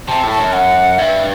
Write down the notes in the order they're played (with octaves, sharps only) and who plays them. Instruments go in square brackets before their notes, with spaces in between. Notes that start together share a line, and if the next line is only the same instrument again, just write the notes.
[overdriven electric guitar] C3 [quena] A5
[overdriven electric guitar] A2
[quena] A5
[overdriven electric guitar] F#2
[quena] F#5
[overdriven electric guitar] G2 [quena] E5